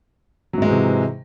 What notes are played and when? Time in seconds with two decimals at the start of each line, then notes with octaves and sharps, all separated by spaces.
0.53 F#3
0.58 G#2
0.62 G#3
0.66 E3
0.71 C3